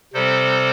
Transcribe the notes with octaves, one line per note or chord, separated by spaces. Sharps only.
C3 G3 C4 A4 C5